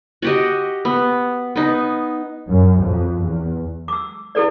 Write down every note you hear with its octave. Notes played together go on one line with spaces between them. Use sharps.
F#4 G4 D#5
B3
B3 D#4
F#2
F2
E2
D6 E6
E4 G#4 A4 B4 D5